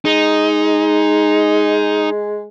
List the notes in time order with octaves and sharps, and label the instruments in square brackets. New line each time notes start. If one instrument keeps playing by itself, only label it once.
[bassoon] G#3 [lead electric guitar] D#4